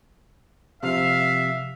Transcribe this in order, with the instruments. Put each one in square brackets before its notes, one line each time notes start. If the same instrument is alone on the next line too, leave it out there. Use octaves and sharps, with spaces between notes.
[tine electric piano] C3 F3 [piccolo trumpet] E5 [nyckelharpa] F5